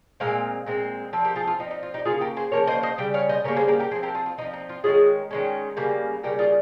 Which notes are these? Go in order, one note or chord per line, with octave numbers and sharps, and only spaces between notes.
A#2 G#3 C4 F5
A#2 G#3 C4
F3 C4
G4 A#4
F4 G#4
F4
F3 C4 D#4
D#4
F4
D#4 G4
C#3 F3 A#3 F4 G#4
G4 A#4
G#4 C5
C#3 F3 A#3 A#4 C#5
C5 D#5
C5 D#5
C#3 G3 G5
C#5 F5
C5 D#5
C#3 G3 A#3 A#4 C#5
G#4 C5
G4 A#4
G4 A#4
F3 C4 G#4 C5
G4 A#4
F4 G#4
F4
F3 C4 D#4
D#4
F4
D#3 G#3 C#4 F4 G#4
D#3 G#3 C#4
C#3 G3 A#3
C#3 G3 A#3 G4 A#4
F4 G#4